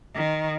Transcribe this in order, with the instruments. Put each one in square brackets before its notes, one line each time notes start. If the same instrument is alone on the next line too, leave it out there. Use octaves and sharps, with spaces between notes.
[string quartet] D#3